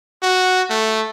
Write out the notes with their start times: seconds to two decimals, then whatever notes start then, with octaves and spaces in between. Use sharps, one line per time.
0.23 F#4
0.70 A3